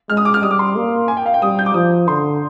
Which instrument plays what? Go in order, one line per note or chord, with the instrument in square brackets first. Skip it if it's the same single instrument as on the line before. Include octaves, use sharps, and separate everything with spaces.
[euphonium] G#3 [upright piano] F6
[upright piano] D#6
D6
F6
[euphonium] G3 [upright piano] D#6
[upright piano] D6
C6
[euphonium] A#3
[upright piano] G#5
G5
F5
G5
[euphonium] G3 [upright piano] D#6
[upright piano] G6
D6
[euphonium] F3 [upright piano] D#6
[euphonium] D3 [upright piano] C6